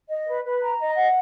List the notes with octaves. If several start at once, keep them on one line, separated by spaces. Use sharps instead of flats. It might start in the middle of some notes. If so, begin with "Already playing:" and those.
D#5
B4
B4
A#5
D#5
F#5